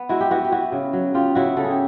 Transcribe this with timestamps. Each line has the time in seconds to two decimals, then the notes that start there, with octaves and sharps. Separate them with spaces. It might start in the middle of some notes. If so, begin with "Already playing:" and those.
Already playing: B3
0.09 G#3 E4 F#4
0.21 G4
0.31 B3 E4 F#4
0.44 G4
0.52 B3 E4 F#4
0.72 C#3
0.93 F#3
1.14 C#3 F4 G4
1.35 C#3 E4 F#4
1.57 C#3 A4
1.64 G#4
1.71 G4